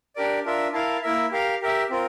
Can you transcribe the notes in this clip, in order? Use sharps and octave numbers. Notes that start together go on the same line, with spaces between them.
D4 G4 A#4 D5
D4 F4 A#4 E5
E4 A#4 F5 A5
A#3 E4 A#4 E5
G4 A#4 F5
G4 A#4 E5
C4 F4 A#4